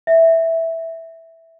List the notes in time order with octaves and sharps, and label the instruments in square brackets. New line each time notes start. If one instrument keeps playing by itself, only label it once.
[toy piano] E5